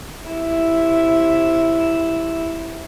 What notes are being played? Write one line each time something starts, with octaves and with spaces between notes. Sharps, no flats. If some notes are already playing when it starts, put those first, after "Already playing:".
C3 E4